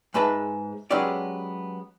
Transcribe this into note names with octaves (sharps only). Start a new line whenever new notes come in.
G#2 G#3 B4 E5 A5
F#3 G#3 B3 C#4 G4 D5